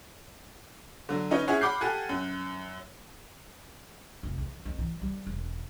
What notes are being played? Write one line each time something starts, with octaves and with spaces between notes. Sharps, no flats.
D3 F#3
C#4 D#4 B4 C#5
C#4 E4 G#4 C#5 E5 F#5
F#5 B5 D6 F6 G6 C7
G4 A4 F#5 G#5 F#6
F#2
F1
E2
F2
E3
G3
E1